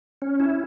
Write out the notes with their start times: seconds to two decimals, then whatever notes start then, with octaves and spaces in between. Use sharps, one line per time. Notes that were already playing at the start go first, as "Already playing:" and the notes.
0.22 C#4
0.40 E4